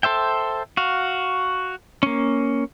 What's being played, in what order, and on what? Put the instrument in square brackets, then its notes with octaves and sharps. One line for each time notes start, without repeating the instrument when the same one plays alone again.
[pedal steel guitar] A4 C5 E5 G5
F#4 F5
A#3 C#4